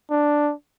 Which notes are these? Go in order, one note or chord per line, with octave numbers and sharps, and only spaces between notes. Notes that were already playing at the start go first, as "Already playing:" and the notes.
D4